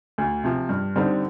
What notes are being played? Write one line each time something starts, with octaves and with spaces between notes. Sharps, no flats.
D2
C3 F3
G2
D3 G3 C4 D#4